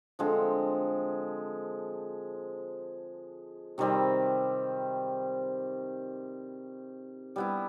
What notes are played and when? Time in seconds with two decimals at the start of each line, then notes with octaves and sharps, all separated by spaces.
0.19 D3 F3 G#3 C4
3.78 C3 D#3 G3 C4
7.36 G3 B3 E4